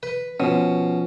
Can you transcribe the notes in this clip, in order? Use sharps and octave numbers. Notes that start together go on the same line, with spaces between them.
B4
B2 F3 C#4